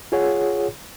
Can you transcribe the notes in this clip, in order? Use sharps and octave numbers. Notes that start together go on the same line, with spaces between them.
F4 G#4 C#5 F#5